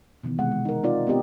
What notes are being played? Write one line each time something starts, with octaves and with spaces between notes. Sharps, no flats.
B2 D#3 E3 B3
C3 G#3 F#5
G#3
D#4 A#4
C4 D#4 F4 D5
B3 C4 G4 D#5